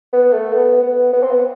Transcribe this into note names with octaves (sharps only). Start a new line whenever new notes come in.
B3
A3
B3
B3
B3
C4
B3